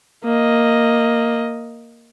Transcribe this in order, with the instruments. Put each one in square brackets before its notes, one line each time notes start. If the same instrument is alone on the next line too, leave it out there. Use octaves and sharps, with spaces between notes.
[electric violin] A#3 D#5